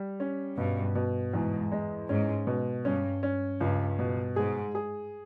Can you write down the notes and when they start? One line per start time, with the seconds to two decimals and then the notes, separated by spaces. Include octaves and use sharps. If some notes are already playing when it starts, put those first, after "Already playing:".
Already playing: G3
0.20 C#4
0.57 G2 B2
0.95 B2
1.33 E2 G#2
1.72 G#3
2.09 G#2 C#4
2.47 B2
2.85 G2 C#4
3.23 C#4
3.61 C#2 G2
3.99 B2
4.36 G#2 G#4
4.75 G#4